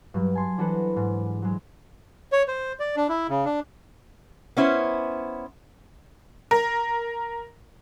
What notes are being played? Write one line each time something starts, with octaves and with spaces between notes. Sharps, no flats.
G2 F#3
G#5 A5 C6
E3 D4 F#4 A4 B4 C5
G#2
F#3 G#3
C#5
C5
D5
D4
E4
C#3
D4
B3 C#4 E4 C5
A#4